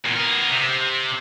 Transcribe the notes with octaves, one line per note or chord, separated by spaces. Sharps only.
E2 A#2
B3 A#4
C3